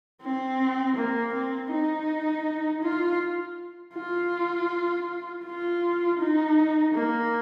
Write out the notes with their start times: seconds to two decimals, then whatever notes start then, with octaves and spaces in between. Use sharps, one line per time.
0.22 C4
0.97 A#3
1.33 C4
1.71 D#4
2.83 F4
3.95 F4
5.45 F4
6.19 D#4
6.94 A#3